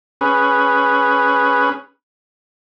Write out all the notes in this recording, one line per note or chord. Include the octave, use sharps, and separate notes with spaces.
C#4 G#4 B4